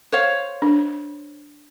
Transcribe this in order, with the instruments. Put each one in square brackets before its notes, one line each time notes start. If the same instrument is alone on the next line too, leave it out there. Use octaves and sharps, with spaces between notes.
[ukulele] C5 C#5 F5
[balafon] D4